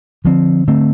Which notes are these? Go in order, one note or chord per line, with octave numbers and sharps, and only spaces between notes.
D3 F3 C4
D3 A3 C4